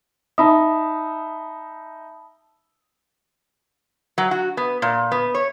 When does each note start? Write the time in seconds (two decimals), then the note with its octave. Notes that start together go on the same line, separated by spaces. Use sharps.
0.38 D#4 E5 A5 B5 D#6
4.18 F#3
4.31 F#4
4.57 B3
4.82 A#2
5.12 B3
5.35 C#5